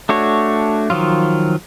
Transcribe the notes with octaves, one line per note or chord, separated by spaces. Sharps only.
A3 D4 F#4 C#5
D#3 F3 F#3 F4